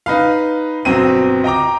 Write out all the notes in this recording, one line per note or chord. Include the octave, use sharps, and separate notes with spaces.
D#4 B4 F5
G1 B2 F#3 C4 D#7
D#5 G5 A#5 D6